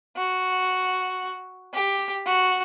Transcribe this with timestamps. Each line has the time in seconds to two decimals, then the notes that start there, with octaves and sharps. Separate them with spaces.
0.17 F#4
1.73 G4
2.26 F#4